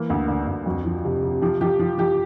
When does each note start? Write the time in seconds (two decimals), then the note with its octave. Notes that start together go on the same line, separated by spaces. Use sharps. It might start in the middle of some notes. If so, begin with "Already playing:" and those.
Already playing: E3 A#3
0.10 D2
0.28 D3
0.47 D2
0.66 F2 F#4
0.85 F3
1.05 C3
1.23 C3
1.41 F3 G4
1.61 F3 G4
1.79 F3
1.98 F3 G4